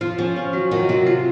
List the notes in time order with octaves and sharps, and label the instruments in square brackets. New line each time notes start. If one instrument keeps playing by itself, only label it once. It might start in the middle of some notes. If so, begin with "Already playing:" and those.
[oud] F3 [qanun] F4
[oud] F3 [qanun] C#4
[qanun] C#4
F#3
[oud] D#3 [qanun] F#3
[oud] C3 [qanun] F#3
[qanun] F4